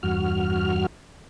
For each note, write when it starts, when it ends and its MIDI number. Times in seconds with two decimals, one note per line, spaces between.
0.03 0.86 40
0.03 0.86 43
0.03 0.86 66
0.03 0.86 89